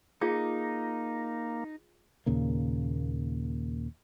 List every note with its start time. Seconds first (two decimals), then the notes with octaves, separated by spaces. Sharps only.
0.21 A#3 D#4 F4 G#4
2.26 D#2 A#2 C#3 A#3